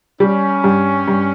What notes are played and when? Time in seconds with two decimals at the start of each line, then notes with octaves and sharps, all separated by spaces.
0.20 G3 C#4
0.64 G2
1.08 G2